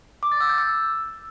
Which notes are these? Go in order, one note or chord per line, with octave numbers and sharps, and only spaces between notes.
D6
A6
E6
G6
E6